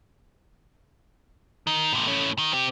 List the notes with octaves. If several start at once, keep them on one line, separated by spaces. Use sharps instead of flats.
D#3
A2 C3
A2 C#4
D#3
C4 G4